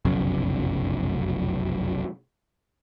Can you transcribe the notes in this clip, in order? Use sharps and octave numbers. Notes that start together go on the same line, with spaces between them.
F1 B1 F#2 C#3